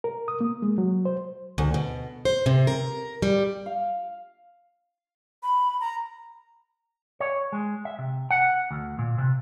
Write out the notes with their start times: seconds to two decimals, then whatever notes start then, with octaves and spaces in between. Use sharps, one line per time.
0.04 A#4
0.28 D#6
0.41 A#3
0.62 G#3
0.78 F#3
1.05 C5
1.58 D2
1.74 B2
2.25 C5
2.46 C3
2.67 A#4
3.22 G3
3.66 F5
5.43 B5
5.81 A#5
7.20 C#5
7.52 G#3
7.85 E5
7.99 C3
8.31 F#5
8.71 D2
8.99 A#2
9.18 C3